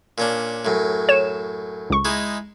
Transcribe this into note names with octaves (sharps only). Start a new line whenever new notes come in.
A#2 C#4 D4
F#2 A2
C#5 E7
C#2 C#6
G#3 D#4 E4